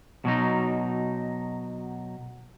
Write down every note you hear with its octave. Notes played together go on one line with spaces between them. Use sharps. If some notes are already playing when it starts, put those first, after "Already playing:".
B2 F#3 D#4